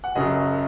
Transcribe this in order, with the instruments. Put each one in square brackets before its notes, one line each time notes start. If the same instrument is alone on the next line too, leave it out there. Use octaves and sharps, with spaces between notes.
[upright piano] F#5
F#1 F#2 C#3 F#3 D#5